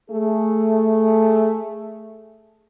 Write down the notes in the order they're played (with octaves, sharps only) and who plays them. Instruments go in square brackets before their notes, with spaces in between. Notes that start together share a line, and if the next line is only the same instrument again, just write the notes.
[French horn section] A3 G#4